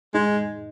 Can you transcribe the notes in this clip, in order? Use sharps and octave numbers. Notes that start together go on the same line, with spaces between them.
G#3 D#4